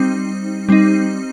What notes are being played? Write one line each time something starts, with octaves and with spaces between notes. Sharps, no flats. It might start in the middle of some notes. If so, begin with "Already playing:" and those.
Already playing: G3 C4 D#4
G3 C4 D#4